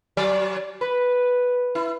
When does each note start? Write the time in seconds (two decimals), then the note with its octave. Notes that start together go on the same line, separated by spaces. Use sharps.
0.17 F#3 D5
0.81 B4
1.75 E4